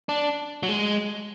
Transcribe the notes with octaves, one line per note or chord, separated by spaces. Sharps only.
D4
F#3
G#3